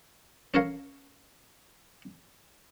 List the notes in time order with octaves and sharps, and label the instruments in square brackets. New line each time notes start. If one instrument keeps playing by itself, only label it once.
[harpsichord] C#4 A4 A#4 C#5 F5